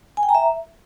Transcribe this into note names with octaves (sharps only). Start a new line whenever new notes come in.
G#5
G5
A#5
E5